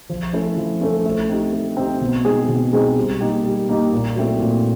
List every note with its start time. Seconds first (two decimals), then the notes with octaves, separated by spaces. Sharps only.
0.09 F3
0.33 A3 C#4 E4 A4
0.57 F3
0.81 A3 C#4 E4 A4
1.05 A3
1.29 C4 D#4 G4
1.53 A3
1.77 C4 D#4 G4
2.01 B2
2.25 G#3 C4 D#4 G#4
2.48 B2
2.73 G#3 C4 D#4 G#4
2.97 G3
3.21 A#3 D#4 G4
3.44 G3
3.69 A#3 D#4 G4
3.92 A#2
4.16 F#3 A3 C4 E4
4.40 A#2